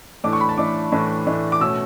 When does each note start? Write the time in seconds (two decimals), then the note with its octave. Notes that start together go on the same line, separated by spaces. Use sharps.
0.24 A2 E3 A3 D4 D6
0.33 C#6
0.41 B5
0.49 A5
0.58 A2 E3 A3 D4 D6
0.92 A2 E3 A3 D4
1.26 A2 E3 A3 D4
1.52 D6
1.60 B2 A3 C#4 E6